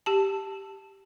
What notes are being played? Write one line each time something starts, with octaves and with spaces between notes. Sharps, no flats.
G4 A5